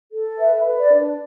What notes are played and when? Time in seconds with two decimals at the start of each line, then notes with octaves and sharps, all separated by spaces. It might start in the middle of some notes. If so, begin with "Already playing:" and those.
0.11 A4
0.38 B4 E5
0.65 B4
0.79 D5
0.93 D4